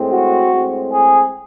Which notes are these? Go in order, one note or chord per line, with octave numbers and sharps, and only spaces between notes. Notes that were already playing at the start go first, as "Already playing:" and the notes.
Already playing: A2 G#3 C4
F#4
A2 G#3 C4
G#4